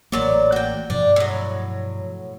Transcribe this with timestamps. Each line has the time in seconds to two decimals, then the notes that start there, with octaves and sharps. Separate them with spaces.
0.12 A1 A#2 F#3 A#3 D5
0.52 F#4 G5
0.90 G2 B2 F3 D4
1.16 A2 F#3